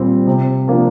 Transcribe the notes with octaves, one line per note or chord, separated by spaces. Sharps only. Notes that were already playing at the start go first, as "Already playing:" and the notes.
Already playing: A#2 G3 C4
C3
F3 A#3 D4